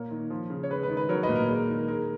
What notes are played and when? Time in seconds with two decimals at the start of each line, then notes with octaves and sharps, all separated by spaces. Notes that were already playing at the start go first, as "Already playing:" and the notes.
Already playing: A#2 A#3 A#4 C#5
0.11 D#3
0.30 F3
0.50 C#3
0.63 C#5
0.70 G#3 B4
0.83 B4
0.89 D#3
0.97 B4
1.09 F#3 A#4 C#5
1.23 B4 D#5
1.29 A#2
1.36 A#4
1.49 G#3
1.55 A#4
1.69 D#3
1.88 G#3 A#4